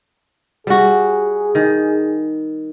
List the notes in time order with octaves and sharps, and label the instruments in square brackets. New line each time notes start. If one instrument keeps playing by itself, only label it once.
[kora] G3 F#4 [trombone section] G#4
[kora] D#3